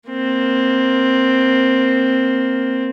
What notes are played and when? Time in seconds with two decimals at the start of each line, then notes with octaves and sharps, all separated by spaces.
0.10 A#3 C4